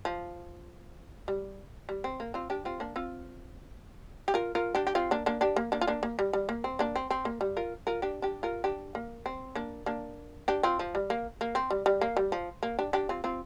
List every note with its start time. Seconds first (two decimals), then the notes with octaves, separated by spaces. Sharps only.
0.05 F3
1.28 G3
1.89 G3
2.04 C4
2.20 A#3
2.34 C4 F4
2.50 D4 G4
2.65 C4 F4
2.80 A#3 D4
2.96 C4 F4
4.28 G4
4.34 F4 A#4
4.55 F4 A#4
4.75 D4 G4
4.87 G4
4.95 C4 F4
5.11 A#3 D4
5.26 A#3 D4
5.41 D4 G4
5.56 A#3
5.72 A#3 D4
5.81 F4
5.87 A#3 D4
6.03 A#3
6.19 G3
6.33 G3
6.49 A#3
6.64 C4
6.79 A#3 D4
6.96 C4
7.10 C4
7.25 A#3
7.41 G3
7.57 F4 A#4
7.87 F4 A#4
8.02 D4 G4
8.22 D4 G4
8.43 F4 A#4
8.64 D4 G4
8.95 A#3
9.26 C4
9.55 A#3 D4
9.86 A#3 D4
10.48 D4 G4
10.63 C4 F4
10.79 F3
10.95 G3
11.10 A#3
11.41 A#3
11.55 C4
11.70 G3
11.86 G3
12.01 A#3
12.17 G3
12.32 F3
12.63 A#3
12.79 D4 G4
12.93 D4 G4
13.09 C4 F4
13.24 C4 F4